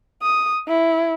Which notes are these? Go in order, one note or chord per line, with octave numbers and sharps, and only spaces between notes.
D#6
E4